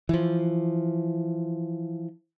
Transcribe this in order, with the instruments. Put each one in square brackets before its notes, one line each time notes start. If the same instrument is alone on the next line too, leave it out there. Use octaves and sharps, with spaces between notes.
[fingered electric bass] E3 F3